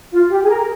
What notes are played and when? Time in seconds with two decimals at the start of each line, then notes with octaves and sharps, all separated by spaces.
0.11 F4
0.30 G4
0.43 G#4
0.49 A#4